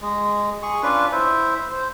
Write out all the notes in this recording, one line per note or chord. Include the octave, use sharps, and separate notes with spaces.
G#3
G#4 C#6
C#4 D4 F4 B4
E4 C5 E5
C5